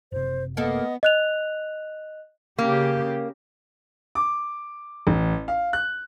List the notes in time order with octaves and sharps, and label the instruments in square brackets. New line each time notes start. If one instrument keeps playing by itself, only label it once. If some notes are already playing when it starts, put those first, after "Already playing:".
[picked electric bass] F#1 C3 [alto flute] C5
[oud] A#3 A4 [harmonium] B3 [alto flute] D#5
[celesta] D#5 F#6 F7
[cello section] C#3 G4 [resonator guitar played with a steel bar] A#3
[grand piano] D6
A1
F5
F#6